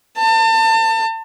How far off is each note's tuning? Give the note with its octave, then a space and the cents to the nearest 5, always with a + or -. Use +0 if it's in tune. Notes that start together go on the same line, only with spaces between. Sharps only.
A5 +35